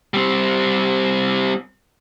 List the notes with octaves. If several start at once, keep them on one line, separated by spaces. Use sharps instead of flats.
G3 C4